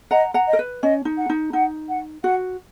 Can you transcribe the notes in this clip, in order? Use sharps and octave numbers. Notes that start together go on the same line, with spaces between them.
D#5 F#5 A#5
F#5 A#5
D#5
A#4
B4
C#4 D#5
D#4
F#5
D#4
D#4 F#5
F#5
F#4 F#5